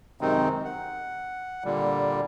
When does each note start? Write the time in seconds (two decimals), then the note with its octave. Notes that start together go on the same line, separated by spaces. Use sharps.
0.21 F#2 C3 D#3 G#3 C4 D#4
0.65 F#5
1.64 A#2 D3 G3